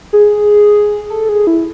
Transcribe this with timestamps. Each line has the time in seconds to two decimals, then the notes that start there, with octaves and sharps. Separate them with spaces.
0.13 G#4
1.10 A4
1.29 G#4
1.47 E4